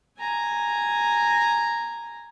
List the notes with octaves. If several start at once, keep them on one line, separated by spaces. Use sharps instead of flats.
G#5 A#5